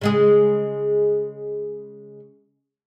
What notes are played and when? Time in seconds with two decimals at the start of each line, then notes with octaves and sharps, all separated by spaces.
0.01 C#3 G#3 G#4